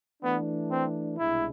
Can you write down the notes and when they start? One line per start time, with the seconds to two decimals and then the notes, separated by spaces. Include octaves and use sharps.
0.23 E3 A3 B3 D4
0.71 C4
1.18 C2 B2 G#3 D4 E4